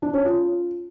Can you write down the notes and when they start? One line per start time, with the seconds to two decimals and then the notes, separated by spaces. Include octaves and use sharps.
0.02 D4
0.13 C#4
0.25 F4